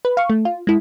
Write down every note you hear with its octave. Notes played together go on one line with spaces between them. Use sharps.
B4
F5 C#6
A3
F4
G#3 E4